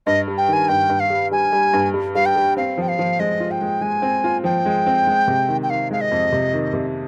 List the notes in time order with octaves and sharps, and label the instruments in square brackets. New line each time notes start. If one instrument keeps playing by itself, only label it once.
[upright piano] G2 [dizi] D#5
[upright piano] G3
[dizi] G5
[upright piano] D#3 [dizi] G#5
[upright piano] G2 [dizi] G5
[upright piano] G2
[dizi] F5
[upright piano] G3
[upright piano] G3 [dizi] G#5
[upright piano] G3
G2
G3
[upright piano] G3 [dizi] F5
[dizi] G5
[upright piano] G3
[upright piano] C4 [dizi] F5
[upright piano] F3 [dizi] G5
[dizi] F5
[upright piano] F3
[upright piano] G#3 [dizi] D#5
[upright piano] F4
[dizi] G5
[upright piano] G#3
[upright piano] G#3 [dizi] G#5
[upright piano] C4
F4
[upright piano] F3 [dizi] G5
[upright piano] G#3
C4
G#3
C3
D#3
[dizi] G5
[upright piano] D#3 [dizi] F5
[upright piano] G#3 [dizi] F5
[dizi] D#5
[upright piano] F2
C3
D#3
C3